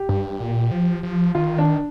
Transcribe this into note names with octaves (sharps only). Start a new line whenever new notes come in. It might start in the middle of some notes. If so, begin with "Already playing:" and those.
Already playing: G4
G2
A#2
F3
F3
D#3 F4
D4